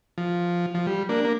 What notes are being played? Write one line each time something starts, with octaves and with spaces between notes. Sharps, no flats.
F3
F3
G3
A#3 D4
A#3